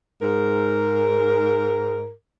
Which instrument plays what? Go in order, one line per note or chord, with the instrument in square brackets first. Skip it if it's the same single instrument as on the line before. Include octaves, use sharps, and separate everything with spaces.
[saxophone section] G#2 A#4